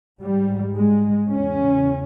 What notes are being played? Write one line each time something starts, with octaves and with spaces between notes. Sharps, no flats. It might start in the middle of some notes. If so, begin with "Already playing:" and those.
G#2 G3
G#3
E2 C#3 C#4